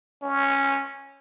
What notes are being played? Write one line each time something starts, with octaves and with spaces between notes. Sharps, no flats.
C#4